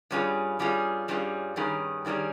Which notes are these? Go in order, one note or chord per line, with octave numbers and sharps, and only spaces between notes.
G2 G3 C#4 F4 G#4
G2 G3 C#4 F4 G#4
G2 G3 C#4 F4 G#4
G2 D#3 G3 C#4 G#4
G2 D#3 G3 C#4 G#4